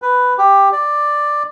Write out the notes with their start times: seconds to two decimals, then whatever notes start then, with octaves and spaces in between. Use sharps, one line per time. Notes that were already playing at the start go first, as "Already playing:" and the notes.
0.02 B4
0.38 G4
0.72 D5